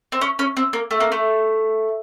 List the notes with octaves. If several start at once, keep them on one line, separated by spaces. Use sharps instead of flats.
C4
C#4
C#4
C4
A#3
A3
A#3
A3